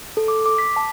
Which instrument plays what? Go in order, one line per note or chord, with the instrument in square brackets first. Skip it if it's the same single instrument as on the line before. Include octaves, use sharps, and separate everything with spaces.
[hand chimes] A4
D6
D6
B6
A5